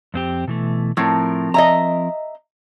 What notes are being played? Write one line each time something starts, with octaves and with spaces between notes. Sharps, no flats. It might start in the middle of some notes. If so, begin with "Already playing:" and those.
F2 C4 G4
B2 E3 A3
A2 F3 C4 A#4
D#5 E5 A#5